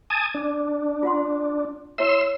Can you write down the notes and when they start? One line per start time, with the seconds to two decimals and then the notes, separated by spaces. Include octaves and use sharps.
0.10 G#5 A5 D#6
0.35 D4
1.03 F4 F#5 C6
1.98 E4 C#5 E5 C6 E6